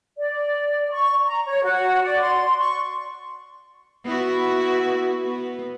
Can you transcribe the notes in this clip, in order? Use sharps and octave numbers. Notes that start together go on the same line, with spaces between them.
D5
C#6
A#5
C#5
F#4
D5
C6
C#6
B3 E4 F#4
B3